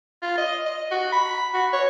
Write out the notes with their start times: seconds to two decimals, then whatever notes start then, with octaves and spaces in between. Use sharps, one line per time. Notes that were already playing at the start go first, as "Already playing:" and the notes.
0.22 F4
0.38 D#5
0.65 D#5
0.91 F#4
1.12 B5
1.54 F#4
1.73 C#5